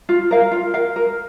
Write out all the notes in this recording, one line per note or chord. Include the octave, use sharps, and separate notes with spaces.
F4
A#4 F5
F4
A#4 F5
A#4